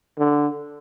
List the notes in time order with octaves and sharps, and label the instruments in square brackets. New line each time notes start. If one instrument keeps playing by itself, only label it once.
[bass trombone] D3